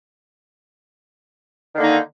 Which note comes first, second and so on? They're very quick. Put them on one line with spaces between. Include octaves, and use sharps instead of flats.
D#3 D3 A#3 D#4